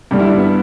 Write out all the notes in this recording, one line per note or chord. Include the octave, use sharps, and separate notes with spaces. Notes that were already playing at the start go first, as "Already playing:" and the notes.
G2 D3 G3 G4
E4
D4
B3